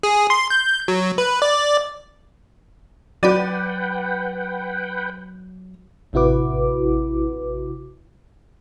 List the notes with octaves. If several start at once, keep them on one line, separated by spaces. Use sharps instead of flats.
G#4
C6
G6
F#3
B4
D5
F#3 F#4 B4 D5 F#5 G5 B5 D#7
A1 C3 E4 F#4 B4 D6